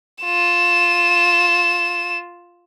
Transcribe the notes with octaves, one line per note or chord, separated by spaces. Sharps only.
F4 E7